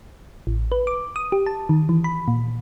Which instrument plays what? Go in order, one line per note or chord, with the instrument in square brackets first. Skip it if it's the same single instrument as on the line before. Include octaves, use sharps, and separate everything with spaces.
[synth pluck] A1
B4
D6
D#6
G4
A5
D#3
E3
B5
A#2